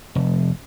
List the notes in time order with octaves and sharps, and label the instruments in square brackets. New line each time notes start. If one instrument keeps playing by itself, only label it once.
[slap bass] F1